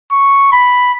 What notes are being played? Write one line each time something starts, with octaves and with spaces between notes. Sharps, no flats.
C#6
B5